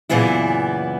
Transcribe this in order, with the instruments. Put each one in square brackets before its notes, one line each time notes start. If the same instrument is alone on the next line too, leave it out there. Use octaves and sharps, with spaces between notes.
[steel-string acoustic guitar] F#2 A#2 C#3 E3 B3 E4